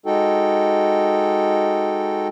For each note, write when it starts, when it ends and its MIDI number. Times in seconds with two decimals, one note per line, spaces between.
0.06 2.28 56
0.06 2.28 63
0.06 2.28 66
0.06 2.28 69
0.06 2.28 79